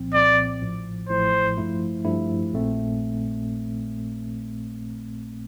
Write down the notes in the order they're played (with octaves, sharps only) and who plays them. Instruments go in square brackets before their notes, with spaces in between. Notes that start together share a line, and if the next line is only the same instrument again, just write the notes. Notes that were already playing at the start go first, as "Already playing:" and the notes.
Already playing: [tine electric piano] C2 A#2 F3 C4
[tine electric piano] C2 A#2 F3 C4 [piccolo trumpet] D5
[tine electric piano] A1 A2 F3
[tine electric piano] A1 A2 F3 [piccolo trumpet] C5
[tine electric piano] G2 F3 A3 E4
G2 F3 A3 E4
A#1 A#2 A3 C4